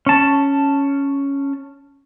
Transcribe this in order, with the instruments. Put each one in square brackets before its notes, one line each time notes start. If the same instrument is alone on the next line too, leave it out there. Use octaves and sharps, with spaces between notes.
[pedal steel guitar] C#4 A5